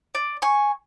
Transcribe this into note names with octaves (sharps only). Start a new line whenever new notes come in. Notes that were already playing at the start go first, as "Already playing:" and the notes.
D5
G#5 C#6